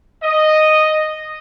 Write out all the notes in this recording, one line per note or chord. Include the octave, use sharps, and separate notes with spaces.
D#5